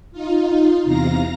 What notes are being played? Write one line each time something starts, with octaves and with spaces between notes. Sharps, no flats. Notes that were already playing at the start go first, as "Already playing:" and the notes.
D#4 F4
E2 C3 F5 A#5 A#6